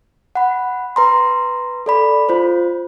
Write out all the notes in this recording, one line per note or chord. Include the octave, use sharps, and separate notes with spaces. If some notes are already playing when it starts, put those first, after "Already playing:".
F#5 B5
B4 A#5 C6
A4 D5 B5
F4 C5